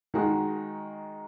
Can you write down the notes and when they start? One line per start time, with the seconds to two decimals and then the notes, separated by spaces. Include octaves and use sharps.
0.14 D#3 G#3 D#4 F#4